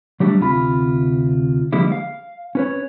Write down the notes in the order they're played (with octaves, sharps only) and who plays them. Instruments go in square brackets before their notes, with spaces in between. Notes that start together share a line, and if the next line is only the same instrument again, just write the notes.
[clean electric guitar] F#3 G3 A3 D4
D2 C3 F4 B5
D3 F3 G3 G#3 A#3 E4
F5
C#4 B4 C#5